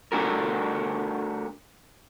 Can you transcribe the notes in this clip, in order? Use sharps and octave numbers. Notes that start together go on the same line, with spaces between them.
A3 D4 F#4 A#4